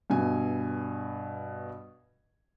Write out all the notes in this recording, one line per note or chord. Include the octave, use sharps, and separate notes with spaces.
G2 B2 G#5